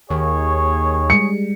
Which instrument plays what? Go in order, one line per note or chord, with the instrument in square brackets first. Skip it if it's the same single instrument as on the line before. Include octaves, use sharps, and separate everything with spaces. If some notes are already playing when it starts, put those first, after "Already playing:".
[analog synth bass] D#2 [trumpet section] G#4 C#5
[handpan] G3 G#3 [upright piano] C#7